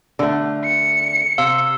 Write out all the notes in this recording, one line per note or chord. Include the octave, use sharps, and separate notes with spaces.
D3 A3
C#7
C3 F5 E6